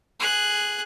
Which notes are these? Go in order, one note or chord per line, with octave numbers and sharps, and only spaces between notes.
G#4 F#6